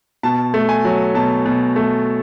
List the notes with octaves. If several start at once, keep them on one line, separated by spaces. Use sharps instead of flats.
B2 A5
A3
G#5
F#3
B2 A5
B2
A3